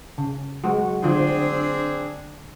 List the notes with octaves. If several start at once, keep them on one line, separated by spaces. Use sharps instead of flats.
C#3
F#3 G#3 F#4
D3 F3 C4 D4 F4 G#4